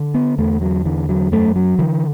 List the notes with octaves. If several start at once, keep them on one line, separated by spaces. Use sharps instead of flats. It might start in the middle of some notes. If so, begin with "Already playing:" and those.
Already playing: D3
B3
E2 A3
F#3
D3 E3
F#3
F#2 A3
F#3
D3 E3